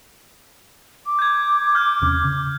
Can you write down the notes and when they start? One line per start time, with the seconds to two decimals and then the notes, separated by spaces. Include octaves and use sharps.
1.06 D6
1.19 G6 G#6
1.75 F6 G6
2.02 E2 C3 C#4
2.25 C#3